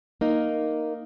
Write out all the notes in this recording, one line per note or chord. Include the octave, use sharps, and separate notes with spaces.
A#3 D#4